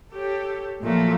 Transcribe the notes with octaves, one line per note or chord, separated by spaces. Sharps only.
G4 A4 C#5
A#2 F3 F#3 A3 A#3